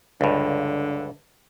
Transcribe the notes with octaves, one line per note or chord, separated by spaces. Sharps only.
C#2 G2 D3